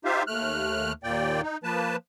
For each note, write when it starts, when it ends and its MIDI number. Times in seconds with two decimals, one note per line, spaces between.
0.05 0.23 63
0.05 0.23 65
0.05 0.23 67
0.05 0.23 72
0.05 0.23 76
0.05 0.23 77
0.27 0.93 39
0.27 0.93 57
0.27 0.93 89
0.27 0.93 90
1.03 1.41 39
1.03 1.41 46
1.03 1.41 58
1.03 1.41 74
1.03 1.41 79
1.42 1.57 63
1.64 1.96 53
1.64 1.96 58
1.64 1.96 71
1.64 1.96 81